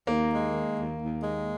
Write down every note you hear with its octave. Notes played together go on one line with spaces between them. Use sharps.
D#2 A#3
G#3
D#3
D#2
D#2
G#3